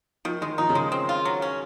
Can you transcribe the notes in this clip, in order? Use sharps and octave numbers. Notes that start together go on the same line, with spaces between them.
D#3 F3
D#3 G#3
F3 D#4
C#3
D#3 G#3
C4
F4
F#3
C#4